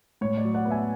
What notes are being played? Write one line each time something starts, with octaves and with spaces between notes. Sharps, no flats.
A2 C#5
D5
F#3
D5 F#5
B3
E5 G#5